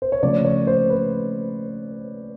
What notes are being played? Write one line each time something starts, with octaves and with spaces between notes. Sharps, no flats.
C5
C#5
C#3 F3 A3 D5
C#5
C5
B4